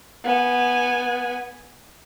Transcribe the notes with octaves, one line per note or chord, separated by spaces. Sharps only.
B3 G#5